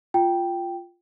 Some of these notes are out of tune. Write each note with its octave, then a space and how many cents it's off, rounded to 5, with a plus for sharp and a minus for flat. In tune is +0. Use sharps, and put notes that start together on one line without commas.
F4 -5 G5 +0